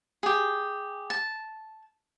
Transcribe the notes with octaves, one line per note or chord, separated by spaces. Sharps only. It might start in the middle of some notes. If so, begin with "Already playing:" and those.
G4 G#4
A5